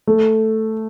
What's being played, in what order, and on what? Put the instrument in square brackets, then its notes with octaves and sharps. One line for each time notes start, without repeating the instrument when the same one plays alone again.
[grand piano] A3